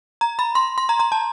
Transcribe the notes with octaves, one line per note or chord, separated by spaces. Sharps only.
A#5
B5
C6
C6
A#5
A#5
A5